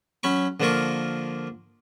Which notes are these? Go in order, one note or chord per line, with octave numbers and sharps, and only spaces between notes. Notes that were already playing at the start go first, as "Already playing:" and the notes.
F#3 C#4 B5 C#6
D3 F3 A#3 F4 A#4 C#6